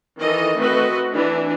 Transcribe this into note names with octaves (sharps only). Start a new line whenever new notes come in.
D#3 E3 A4 D#5
A3 C4 F#4 B4 D#5
E3 D4